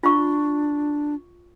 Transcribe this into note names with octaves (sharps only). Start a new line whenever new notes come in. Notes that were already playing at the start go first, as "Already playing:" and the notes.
D4 F4 C#6